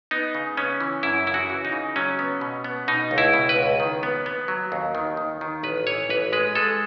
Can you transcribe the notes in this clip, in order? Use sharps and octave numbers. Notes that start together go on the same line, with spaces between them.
B3 D#4
C#3
B3 C#4
E3
F#2 E4
C#3 E4
F#4
E3
D#4
C#3
F#3 C#4
B3
B2
B3
B2 D#4
C#2
E4
B2
B4
C#2
D#3
B3
B3
F#3
D#2
D#3
D#3
D#3
A1 B4
E3 C#5
A1 B4
G#3 B4
G#3 A4